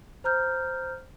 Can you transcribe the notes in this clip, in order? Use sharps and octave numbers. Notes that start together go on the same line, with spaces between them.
C5 A#5 F6 G6